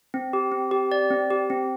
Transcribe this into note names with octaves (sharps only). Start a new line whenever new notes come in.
C4
G4
C4
G4
D5
C4
G4
C4